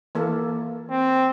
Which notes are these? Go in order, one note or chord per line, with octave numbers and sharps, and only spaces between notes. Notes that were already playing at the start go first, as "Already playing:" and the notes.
E3 A#3 A4
C4